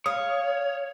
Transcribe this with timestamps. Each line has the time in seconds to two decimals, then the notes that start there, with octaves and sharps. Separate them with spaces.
0.06 C#5 F5 D#6